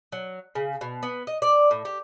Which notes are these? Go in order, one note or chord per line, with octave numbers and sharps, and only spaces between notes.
F#3
C#3
B2
B3
D#5
D5
A2
G4